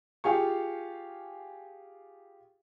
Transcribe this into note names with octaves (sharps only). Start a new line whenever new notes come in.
F4 G4 G#4 F5 G#5 C#6